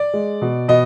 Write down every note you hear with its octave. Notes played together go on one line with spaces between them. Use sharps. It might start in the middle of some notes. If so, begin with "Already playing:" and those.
Already playing: D5
G#3
B2
B2 D#5